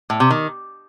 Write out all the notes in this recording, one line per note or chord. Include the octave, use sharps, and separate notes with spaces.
A2
C3
D#3